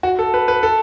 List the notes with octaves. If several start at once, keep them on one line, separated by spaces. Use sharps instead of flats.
F#4
A4
B4
B4
A4